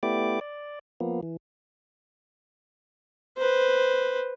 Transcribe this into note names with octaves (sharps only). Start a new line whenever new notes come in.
A3 B3 E4 G4 D5 D6
D5
F3 A#3 B3
E3
B4 C5